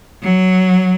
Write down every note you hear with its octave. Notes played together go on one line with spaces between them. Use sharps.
F#3